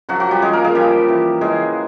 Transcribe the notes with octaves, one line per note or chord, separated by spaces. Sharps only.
C#3 F3 F#3 F#4
F#3 F#4
G3 G4
C#3 F3 G#3 G#4
A#3 A#4
G#3 G#4
C#3 F3 G3 G4
C#3 E3
C#3 E3 G#3 G#4